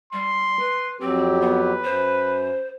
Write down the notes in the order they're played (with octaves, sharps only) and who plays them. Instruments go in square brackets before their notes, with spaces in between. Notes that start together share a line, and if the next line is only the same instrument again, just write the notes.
[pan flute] G3 [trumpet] C6
[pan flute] B4
[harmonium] F2 F#3 G4 [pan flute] C4
[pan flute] B3 [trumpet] B4
[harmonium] F#2 [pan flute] C5